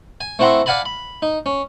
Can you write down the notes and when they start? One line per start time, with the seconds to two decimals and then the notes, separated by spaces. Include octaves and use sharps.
0.21 G#5
0.39 A3 C4 E4 F#5 A#5 C6
0.66 D5 F5 F#5 G#5 A5 B5
0.85 B5
1.22 D#4
1.46 C#4